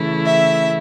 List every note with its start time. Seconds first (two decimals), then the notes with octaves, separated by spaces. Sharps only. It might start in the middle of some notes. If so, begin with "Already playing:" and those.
Already playing: C#3 E3 A3 E4
0.25 E5